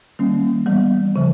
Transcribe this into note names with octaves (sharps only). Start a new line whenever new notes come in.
D#3 G3 A#3 C#4
E3 G3 B3
C#3 F3